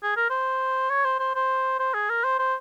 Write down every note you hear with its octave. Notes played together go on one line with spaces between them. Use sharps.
G#4
A#4
C5
C#5
C5
C5
C5
C5
G#4
A#4
C5
C5